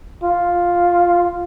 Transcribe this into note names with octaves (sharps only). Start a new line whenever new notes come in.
F4